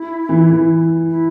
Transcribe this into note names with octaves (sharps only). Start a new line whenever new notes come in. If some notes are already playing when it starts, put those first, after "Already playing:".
Already playing: E4
E3
E3
E4